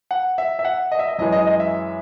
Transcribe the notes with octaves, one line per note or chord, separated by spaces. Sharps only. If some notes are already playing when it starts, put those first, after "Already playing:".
F#5
E5
E5
F#5
D#5
E5
D#5
F#2 E3 G#3 D#5
D#5
D#5
E5